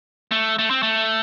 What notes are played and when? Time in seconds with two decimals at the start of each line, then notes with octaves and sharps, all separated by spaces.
0.31 A3
0.59 A3
0.71 C4
0.83 A3